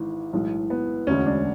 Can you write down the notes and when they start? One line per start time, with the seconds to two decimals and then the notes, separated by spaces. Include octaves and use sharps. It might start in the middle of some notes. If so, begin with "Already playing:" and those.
Already playing: G#1 G#2 E3 G#3
0.33 B1 A2 E3 G#3
0.70 B3
1.07 E1 D2 D3 G#3 C#4
1.26 D4